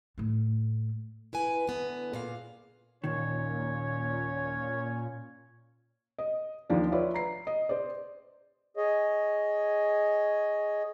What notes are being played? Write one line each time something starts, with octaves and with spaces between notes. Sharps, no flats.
A2 A3
E4 B4 G#5
D3 B3
A#2 C#3 F5
D#2 A#2 D#3 C#4 C#5
D#5
D#2 F3 D4
F4 B4 C#5 D5 E5
A#5 C7
D#5
C5 D5
G#4 C#5 D#5